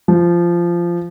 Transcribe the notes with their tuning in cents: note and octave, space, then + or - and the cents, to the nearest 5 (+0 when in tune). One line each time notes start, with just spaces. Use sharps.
F3 -15